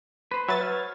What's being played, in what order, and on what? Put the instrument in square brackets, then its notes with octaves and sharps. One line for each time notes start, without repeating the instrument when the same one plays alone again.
[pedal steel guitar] B4 C5
[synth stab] F#3 B4 A6 [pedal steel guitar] E5
[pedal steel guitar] C5 C#5 F6